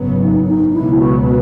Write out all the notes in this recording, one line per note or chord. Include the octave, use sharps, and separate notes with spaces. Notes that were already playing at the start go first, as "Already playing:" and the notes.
Already playing: G#1 F#2 C#3 F#3 B3
D#4
D#4
C#2 B2 F#3 B3 E4
F#4
B4